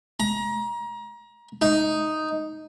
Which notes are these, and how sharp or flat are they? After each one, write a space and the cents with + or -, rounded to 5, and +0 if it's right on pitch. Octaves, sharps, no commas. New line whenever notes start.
A#5 +30
D#4 +0